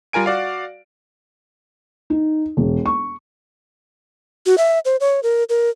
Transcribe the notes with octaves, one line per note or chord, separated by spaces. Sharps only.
G3 F4 A#4 G#5 D7
F#4 D5 F5
D#4
E1
C#6
F#4
E5
C5
C#5
A#4
A#4